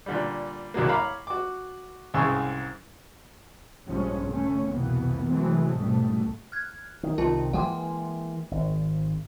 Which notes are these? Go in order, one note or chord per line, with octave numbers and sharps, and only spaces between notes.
A#2 D3 G3
C2 D3 F#3 A#3
C#5 F5 A#5 B5 D6
F#4 D6
C2 G#2 C#3 G#4 C#6 E6
A#1 G2 F3 G#3 C#4
D3 A3 C#4
C2 F2 B2 E3 A#3 B3
C3 E3 F#3 G#3 A3 C4
C#2 G#2 B2 G3 A3
F6 F#6 G#6
D#3
C2 C3 D#3 F4 A#4 A5
E3 G#3 A#3 F#5 G5 C6
G#1